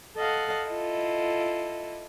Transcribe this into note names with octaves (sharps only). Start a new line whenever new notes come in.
A4 D#5 F5 F#5
E4 F4 A4 D#5